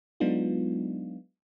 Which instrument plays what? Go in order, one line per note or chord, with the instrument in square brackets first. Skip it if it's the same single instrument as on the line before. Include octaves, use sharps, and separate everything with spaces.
[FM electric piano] F#3 G#3 B3 D4 D#4 F4